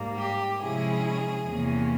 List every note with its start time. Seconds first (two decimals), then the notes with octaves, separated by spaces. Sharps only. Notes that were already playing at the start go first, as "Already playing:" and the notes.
Already playing: G#2 G3 A#3
0.19 G4
0.61 C3 F3 G#3 C#4 E4 G#4
1.46 E2 C3 E3 A#3 C#4